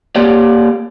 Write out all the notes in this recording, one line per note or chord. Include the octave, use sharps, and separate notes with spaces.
A#3 G4 C#5 D5